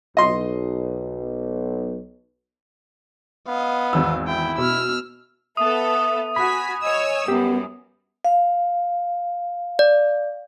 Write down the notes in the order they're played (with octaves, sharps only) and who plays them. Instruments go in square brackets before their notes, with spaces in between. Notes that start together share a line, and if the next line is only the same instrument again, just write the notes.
[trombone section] B1 [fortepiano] D#5 C6
[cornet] B3 [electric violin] D#5 F5
[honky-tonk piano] G#1 E2 E6
[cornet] E4 [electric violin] G5
[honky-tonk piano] B2 [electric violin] E6 F6
[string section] B3 A4 [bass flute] E5 [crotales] D#6 D#7
[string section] F#4 G#5 B6 [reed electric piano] B5
[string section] C#5 G#5 E6 [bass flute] D#5
[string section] F#2 G3 [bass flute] B3 [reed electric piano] G4
[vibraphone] F5
[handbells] D5